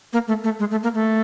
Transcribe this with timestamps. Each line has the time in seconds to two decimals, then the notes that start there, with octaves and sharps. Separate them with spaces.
0.13 A#3
0.28 A3
0.44 A3
0.60 G#3
0.71 A3
0.83 A#3
0.94 A3